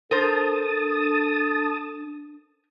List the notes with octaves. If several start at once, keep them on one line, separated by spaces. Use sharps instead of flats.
D4 A4 A#4 C5 A5 D#6